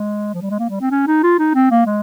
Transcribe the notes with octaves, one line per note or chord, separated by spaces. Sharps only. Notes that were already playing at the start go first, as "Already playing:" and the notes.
Already playing: G#3
F3
G3
G#3
A#3
G3
C4
C#4
D#4
F4
D#4
C4
A#3
G#3